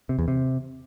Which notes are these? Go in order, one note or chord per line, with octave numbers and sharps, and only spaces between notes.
C3
E2
C3